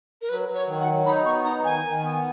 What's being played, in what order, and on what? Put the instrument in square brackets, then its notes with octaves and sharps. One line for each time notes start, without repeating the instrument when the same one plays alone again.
[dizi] A#4
[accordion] F#3 [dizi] B4
[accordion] F#3
[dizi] C#5
[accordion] D#3
[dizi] F#5
[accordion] F#3
[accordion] D#4 [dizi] B5
[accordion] B3 [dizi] C#6
[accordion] D#4 [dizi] A#5
[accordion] D#3 [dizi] G#5
[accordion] D#3
B3